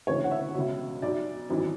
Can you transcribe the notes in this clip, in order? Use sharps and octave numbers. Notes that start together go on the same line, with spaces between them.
E1 D2 C#3 E3 C#5
F#5
E5
C#2 B2
B1 B2 D5
G#1 F#2 E3